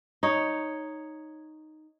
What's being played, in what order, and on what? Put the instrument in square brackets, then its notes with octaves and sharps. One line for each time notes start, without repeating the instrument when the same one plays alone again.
[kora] D#4 C#5